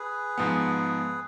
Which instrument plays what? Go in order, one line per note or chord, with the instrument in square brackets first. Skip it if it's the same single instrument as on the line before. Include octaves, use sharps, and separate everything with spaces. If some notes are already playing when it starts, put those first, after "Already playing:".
Already playing: [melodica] G#4 B4
[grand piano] G#2 F3 B3